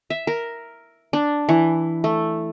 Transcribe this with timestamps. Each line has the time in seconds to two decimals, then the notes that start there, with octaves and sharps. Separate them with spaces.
0.10 E5
0.27 A#4
1.13 D4
1.49 E3
2.04 A3